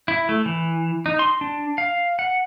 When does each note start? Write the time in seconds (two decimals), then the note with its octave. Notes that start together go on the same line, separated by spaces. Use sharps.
0.08 E4
0.29 A3
0.46 E3
1.06 D#4
1.19 C6
1.41 D4
1.78 F5
2.19 F#5